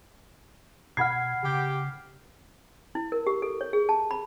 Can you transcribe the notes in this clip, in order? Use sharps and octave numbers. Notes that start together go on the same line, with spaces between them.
B2 F#5 B5 F6 G#6 C7
C#3 G4
E4
A#4
G4
A4
C#5
G#4
A5
B5